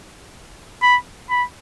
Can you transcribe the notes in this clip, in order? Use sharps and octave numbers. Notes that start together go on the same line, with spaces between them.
B5
B5